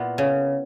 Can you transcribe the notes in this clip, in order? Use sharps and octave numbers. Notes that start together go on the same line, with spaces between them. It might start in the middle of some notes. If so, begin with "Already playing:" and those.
Already playing: A#2 B3 E4
C#3